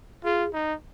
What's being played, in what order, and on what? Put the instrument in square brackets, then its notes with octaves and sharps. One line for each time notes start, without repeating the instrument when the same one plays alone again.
[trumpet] F4 [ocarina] G#4
[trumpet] D#4